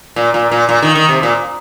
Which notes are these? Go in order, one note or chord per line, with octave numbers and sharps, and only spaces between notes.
A#2
A#2
A#2
A#2
D#3
D#3
C3
A#2